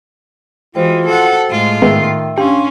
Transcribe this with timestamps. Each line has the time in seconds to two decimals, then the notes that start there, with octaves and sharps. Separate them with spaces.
0.75 E3 G#3 F4 F#4 C5 G5
1.06 A4 F#5
1.50 A2 G#3 F4
1.82 G#2 D#3 G#3 B3 E5 G5 E6
2.38 C#4 D4 G4 F5 C6